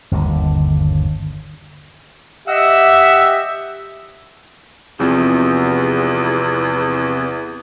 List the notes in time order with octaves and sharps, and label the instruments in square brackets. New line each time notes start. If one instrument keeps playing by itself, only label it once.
[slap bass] G1 D#2 D3
[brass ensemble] G4 E5 [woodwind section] D#5 F#5 E6
[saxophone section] E2 [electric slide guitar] C3 F3